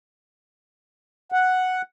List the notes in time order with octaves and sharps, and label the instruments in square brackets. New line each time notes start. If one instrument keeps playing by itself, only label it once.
[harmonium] F#5